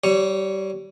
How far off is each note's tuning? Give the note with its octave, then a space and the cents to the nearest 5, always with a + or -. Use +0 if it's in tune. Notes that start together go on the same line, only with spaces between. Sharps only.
G3 -25 C#5 +0